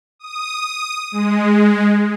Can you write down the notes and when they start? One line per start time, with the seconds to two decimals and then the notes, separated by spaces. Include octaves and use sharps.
0.19 D#6
1.12 G#3